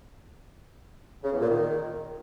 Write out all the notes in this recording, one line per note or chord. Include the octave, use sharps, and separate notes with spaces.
C#3
E2
A#2
D#3